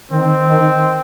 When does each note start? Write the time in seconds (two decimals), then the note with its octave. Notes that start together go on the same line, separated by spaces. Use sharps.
0.11 D#3 C4
0.48 D#3